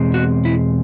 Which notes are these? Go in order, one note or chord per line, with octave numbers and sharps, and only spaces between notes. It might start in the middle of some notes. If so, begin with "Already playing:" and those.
Already playing: E2 B2 G#3 C4
F#4
E4